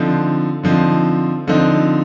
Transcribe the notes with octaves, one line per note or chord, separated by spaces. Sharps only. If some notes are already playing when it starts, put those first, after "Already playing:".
Already playing: D3 F3 C4 D#4
D3 F3 C4 D#4
D3 F3 C4 D#4